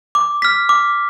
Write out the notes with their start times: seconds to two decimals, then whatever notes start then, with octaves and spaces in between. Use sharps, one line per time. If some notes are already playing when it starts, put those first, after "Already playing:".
0.15 D6
0.42 F6 B6
0.69 D6